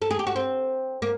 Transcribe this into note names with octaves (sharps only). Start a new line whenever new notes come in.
A4
G#4
G4
F#4
C4
A#3